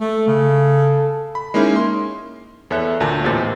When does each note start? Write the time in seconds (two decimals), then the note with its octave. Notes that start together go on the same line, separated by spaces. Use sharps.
0.01 A3 A4
0.27 C#3
1.35 B5
1.54 G#3 A#3 C#4 D#4 E4
1.76 C6
2.71 E2 A4 C#5 E5 F#6
3.00 D2 A#2 A5
3.24 A1 E2 A#2 G4 C5 A6